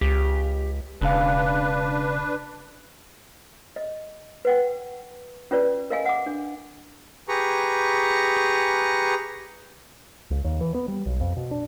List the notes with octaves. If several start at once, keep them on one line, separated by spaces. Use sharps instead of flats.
C#2 G4
E1 C#3 D4 B4 F5
D#5
B4 F#5 G5
C#4 F4 B4 D5
A#4 D#5 F5 G#5
F#5 D6
D4
G4 G#4 B4 A#5 C#6
C#2
D#2
E3
B3
G3
B1
F2
B2
D4